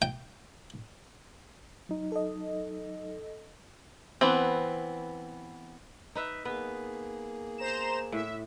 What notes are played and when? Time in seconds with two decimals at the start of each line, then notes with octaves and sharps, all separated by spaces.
0.02 G5
1.89 F#3 D#4
2.12 A4 D#5
4.21 E3 B3 C4
6.15 D#4 B4 E5
6.45 A#3 B3 G#4 B4
7.58 C5 A#5 E7
8.12 A2 E5